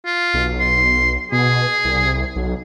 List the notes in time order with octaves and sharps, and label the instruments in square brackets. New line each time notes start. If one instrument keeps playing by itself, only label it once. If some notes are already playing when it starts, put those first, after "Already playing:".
[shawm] F4
[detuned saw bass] B1
[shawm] C6
[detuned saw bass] B2 [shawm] G#4
[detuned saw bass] C2
B1